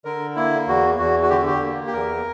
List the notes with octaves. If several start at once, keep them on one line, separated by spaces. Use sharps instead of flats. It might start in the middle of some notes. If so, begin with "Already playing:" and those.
D3 A#4
A#3 E4
E2 F#4
E2 F#4
F#4
D3 G4
F#4
G4
A#3
G4
E2 A#4